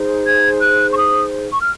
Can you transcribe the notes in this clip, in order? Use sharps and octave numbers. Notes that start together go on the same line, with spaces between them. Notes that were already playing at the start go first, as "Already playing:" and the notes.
Already playing: D#4 G#4 C5
G#6
F#6
C#6
D#6
C#6
F6